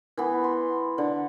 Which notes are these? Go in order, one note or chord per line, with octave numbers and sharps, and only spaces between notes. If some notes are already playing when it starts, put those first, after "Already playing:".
E3 B3
C6
D3